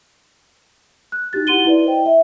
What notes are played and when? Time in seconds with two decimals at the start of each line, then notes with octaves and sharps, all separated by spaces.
1.12 F#6
1.33 D#4 F#4 G4 A6
1.47 E4 F#5 C6 D#7 G7
1.65 E4 B4 D5
1.86 C5 D#5 G5
2.06 E5